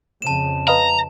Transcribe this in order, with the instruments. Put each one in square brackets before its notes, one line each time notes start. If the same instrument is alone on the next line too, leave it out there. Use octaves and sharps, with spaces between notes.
[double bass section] F2 C#3 [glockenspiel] A5 E7
[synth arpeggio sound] B4 D#5 F5 [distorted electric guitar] A#5